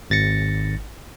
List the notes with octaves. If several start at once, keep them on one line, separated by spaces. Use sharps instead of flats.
G#1 A6 A#6 C#7